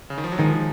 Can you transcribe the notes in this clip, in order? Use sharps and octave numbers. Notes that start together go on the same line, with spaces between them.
C#3
D#3
F3
F#3
D#3 F3 G#3